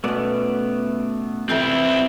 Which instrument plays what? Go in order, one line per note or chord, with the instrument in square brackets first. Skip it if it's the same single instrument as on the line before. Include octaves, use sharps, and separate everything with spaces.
[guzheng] B2 C#4 [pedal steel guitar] A3 B3 D5
[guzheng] F2 C3 E3 [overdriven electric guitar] C4 E4